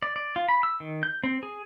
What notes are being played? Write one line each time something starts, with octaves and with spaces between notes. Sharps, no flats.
D5
D5
F4
B5
E6
D#3
G6
C4
G#4